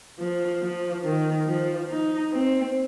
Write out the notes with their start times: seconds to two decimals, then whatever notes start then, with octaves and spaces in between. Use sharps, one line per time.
0.19 F3
0.62 F3
1.04 D#3
1.47 F3
1.90 D#4
2.33 C4